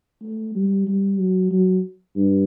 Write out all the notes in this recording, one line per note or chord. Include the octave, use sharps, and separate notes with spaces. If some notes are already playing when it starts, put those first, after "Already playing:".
A3
G3
G3
F#3
F#3
G2